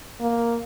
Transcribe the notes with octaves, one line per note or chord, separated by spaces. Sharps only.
A#3